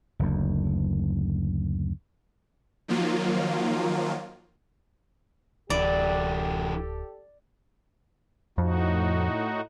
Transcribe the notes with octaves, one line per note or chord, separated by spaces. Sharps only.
F#1 D2
D#3 F3 F#3 A#3 F4
D1 E3 D4 G4 A4 D5
F2 A2 D#4 F#4